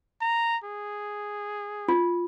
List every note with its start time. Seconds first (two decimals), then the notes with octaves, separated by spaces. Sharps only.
0.21 A#5
0.64 G#4
1.88 F4